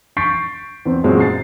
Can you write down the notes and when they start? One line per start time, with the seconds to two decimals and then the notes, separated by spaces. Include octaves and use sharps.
0.17 C#6 G6 A6 B6 C7 D7
0.85 E2 C4
1.04 F#2 A#2 G#3 C4 C#4 F#4
1.20 A6 C7